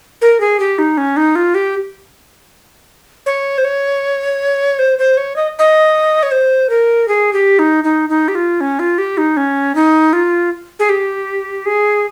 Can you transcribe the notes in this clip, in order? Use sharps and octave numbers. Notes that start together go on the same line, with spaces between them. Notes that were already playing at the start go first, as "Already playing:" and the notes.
A#4
G#4
G4
D#4
C#4
D#4
F4
G4
C#5
C5
C#5
C5
C5
C#5
D#5
D#5
C#5
C5
A#4
G#4
G4
D#4
D#4
D#4
G4
F4
C#4
F4
G4
D#4
C#4
D#4
F4
G#4
G4
G#4